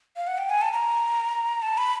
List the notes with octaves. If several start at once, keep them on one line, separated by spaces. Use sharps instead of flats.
F5
F#5
G5
G#5
A5
A#5
A5
B5